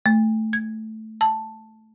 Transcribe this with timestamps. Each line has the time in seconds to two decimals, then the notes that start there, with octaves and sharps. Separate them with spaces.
0.06 A3
0.53 G#6
1.21 A5